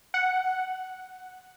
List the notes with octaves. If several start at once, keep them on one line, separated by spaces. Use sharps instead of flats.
F#5